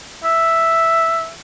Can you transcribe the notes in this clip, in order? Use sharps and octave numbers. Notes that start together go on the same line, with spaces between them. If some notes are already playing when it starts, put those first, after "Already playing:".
E5